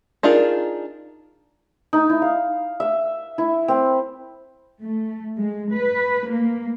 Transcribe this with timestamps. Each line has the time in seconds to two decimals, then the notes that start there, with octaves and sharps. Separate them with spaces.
0.23 D4 D#4 F4 G#4 A#4
1.93 D#4
2.09 E4
2.22 F5
2.80 E5
3.38 E4
3.68 C4
4.82 A3
5.37 G#3
5.75 B4
6.30 A#3